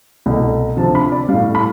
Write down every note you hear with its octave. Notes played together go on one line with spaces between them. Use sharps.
C2 B2 A3
D2 C3 F3 A5
B5
D5
A2 G3 F5
B5